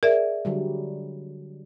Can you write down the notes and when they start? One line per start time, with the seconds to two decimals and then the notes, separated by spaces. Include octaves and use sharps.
0.03 G#4 A#4 D5 E5
0.45 D3 F#3 G3